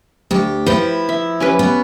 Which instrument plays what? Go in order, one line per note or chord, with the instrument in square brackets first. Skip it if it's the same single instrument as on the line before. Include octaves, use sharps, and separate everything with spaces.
[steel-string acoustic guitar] D2 G4
[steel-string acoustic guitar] F3 E4 [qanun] B4 G5
[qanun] E5
C#4 G4 B4
[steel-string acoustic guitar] B3